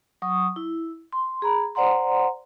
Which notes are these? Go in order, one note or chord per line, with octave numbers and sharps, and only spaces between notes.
F#3 C#6 D#6
E4
C6
G#4 A#5 B5
C5 D5 F#5 A#5 C6